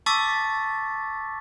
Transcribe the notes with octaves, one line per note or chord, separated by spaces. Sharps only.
A5 C#6 D6 E6 A6 B6